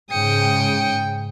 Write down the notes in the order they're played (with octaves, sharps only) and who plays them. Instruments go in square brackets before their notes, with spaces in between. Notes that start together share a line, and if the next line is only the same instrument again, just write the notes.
[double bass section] G#2 C#3 [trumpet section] G5 [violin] D#6 C#7